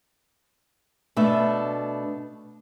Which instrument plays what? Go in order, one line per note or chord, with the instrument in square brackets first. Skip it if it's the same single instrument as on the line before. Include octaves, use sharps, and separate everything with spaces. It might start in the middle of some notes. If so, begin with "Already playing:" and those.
[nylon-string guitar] B2 A3 D4 E5